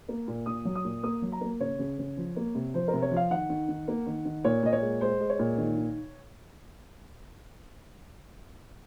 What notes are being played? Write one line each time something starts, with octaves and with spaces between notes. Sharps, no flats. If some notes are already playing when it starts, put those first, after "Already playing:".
A#3
A#2
A#2 D#6
F#3
D#6
A#2
A#3 D#6
F#3
A#5
A#3
C#3 C#5
C#3
C#3
F3
A#3
C3
F3 C5
A#4
C3
C#5
F3
F5
D#3 F#5
D#3
D#3
A#3
D#3
D#3
A#2 C#5
A#2 D#5
C#5
G#3
G#3 C5
G#3
C#5
A#2
D#3
D#3